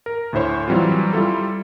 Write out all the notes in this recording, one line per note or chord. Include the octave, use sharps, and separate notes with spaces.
A#4
D2 A2 E4 C5 C#5
E3 F#3 G3 C4 F4
G3 E4 F4 A4